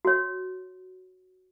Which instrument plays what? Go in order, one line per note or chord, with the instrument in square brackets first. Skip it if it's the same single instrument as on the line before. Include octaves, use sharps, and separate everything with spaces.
[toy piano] F#4 C#5